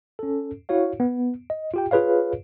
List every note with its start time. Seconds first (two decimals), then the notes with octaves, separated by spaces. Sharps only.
0.19 C#4 A4
0.69 E4 F#4 C#5 F5
1.00 B3
1.50 D#5
1.74 F4 G4 G5
1.91 F4 G#4 B4 C#5 F5